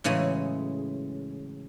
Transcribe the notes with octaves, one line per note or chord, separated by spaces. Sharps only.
A2 C#3 E3 F#3 G#3